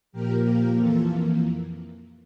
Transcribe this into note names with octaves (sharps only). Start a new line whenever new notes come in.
A#2 F3 A#3 G4 A#4
G4 A#4
F2 E3 A#3 F4 A4